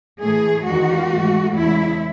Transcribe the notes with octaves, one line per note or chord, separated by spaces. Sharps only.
A2 E3 A3 G#4
E2 D#3 G#3 F#4
G#2 E3 A3
E2 C#3 G#3 E4